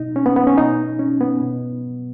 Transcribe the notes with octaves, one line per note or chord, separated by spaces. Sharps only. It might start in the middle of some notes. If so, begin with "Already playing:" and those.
Already playing: B2 D#4
C#4
B3
B3
C#4
B2 D#4
C#4
B3
B2